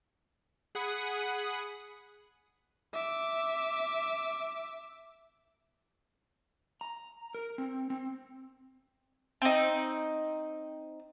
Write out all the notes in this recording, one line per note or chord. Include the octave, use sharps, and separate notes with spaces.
G#4 F#5 B5 D#6
E5 D6
A#5
A#4
C4
C4
C4 D#4